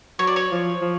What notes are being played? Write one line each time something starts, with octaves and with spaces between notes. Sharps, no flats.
F#3 C#5
D5
C#5
F3
F3